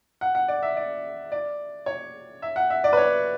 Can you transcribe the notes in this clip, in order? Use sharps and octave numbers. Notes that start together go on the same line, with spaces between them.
F#5
F#5
D5
E5
D5
D5
C#5
E5
F#5
E5
D5
B4
C#5